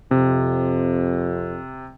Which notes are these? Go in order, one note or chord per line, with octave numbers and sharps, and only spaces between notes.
F2 C3